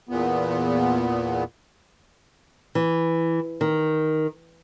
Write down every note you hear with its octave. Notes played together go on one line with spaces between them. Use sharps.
E2 A#2 B3
E3
D#3